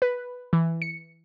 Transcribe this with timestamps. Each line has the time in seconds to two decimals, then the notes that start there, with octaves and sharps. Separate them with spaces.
0.02 B4
0.53 E3
0.82 C#7